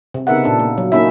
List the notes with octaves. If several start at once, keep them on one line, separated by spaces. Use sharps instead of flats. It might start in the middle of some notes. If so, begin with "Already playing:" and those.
C3
C#3 B3 D#4 A#4 E5 F#5
A#2 D4 A4
A#3
F#3
A#3 C#4 D#4 E4 E5